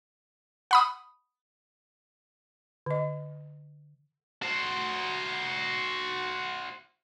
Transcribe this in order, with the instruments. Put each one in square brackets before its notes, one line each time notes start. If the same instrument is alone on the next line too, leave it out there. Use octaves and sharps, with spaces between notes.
[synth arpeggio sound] F#5 B5 D#6
[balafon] D3 D#5
[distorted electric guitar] F#4 C5